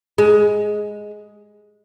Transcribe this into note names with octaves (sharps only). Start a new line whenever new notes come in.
G#3